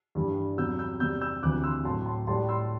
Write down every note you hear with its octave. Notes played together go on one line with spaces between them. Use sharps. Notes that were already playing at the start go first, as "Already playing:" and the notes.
G2 E3 G3
E2 C3 F#3 E6 G6
E6 G6
E2 C3 G3 E6 G6
E6 G6
D2 C3 E3 D6 F#6
C6 E6
A2 F#3 A5 C6
A5 C6
A2 G3 A5 C6
C6 E6